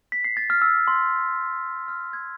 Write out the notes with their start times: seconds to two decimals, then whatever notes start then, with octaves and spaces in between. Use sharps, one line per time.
0.12 B6
0.25 C7
0.37 A6
0.50 F6
0.62 E6
0.87 C6
1.88 F6
2.13 G#6